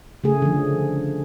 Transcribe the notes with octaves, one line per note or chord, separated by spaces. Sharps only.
C#3 A3 G#4
D3 F3